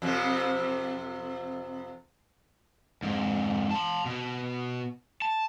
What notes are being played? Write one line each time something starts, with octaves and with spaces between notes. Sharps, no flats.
F2 C3 C4
F2 G#2
A5 C6
B2
A5